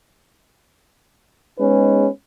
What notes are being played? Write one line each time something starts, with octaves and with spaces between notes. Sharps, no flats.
G#3 B3 C#4 D#4 G#4 B4